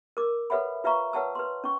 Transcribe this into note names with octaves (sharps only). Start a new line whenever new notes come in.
A#4 D6
A4 B4 C#5 E5 F#5 B5
F4 B4 E5 F5 A#5 C#6
B4 C#5 F#5 A5 E6
B4 C6
C#4 C#6